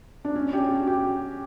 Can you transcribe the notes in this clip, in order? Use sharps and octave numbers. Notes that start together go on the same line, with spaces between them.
D4
C#4
G4
F#4
G4